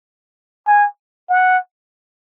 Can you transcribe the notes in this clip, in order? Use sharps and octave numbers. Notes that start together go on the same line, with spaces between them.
G#5
F#5